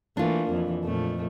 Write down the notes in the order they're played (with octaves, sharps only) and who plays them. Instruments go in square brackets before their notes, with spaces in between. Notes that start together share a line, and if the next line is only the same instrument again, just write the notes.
[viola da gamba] E3 A3 A#3 [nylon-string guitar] D4 F4
[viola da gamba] F2 E3
F2 A#2 A3